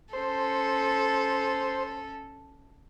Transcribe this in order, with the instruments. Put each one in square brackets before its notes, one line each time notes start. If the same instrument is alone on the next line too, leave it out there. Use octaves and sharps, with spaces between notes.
[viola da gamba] C#4 A4 [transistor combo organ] C5